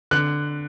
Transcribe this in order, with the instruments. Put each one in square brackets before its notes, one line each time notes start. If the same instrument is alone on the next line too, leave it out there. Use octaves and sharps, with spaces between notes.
[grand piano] D3 F#6